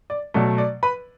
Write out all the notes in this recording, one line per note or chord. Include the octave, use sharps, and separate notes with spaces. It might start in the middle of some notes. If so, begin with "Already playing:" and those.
D5
B2 F#3 A3 D5
D5
B4 B5